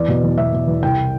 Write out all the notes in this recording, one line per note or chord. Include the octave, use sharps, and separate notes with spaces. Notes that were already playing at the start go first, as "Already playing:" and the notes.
Already playing: E2 D5
B2
E2
B2 E5
B2
E2
C2 G5